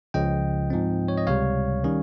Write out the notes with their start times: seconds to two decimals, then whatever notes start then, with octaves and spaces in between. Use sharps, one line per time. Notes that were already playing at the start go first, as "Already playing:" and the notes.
0.14 C#2 C#3 F3 D#5 G5
0.70 G#2 F3 C4
1.08 C#5
1.17 D#5
1.27 C#2 C3 G3 C#5 F5
1.84 D#3 G3 C#4